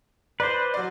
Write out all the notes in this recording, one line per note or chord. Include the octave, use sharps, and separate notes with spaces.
B4 C5 D5
F#3 D5